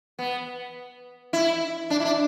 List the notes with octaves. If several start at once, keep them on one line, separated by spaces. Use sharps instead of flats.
B3
E4
D4
E4
D4